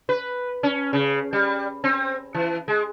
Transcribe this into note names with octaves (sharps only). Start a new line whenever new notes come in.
B4
C#4
C#3
G3
C4
E3
G#3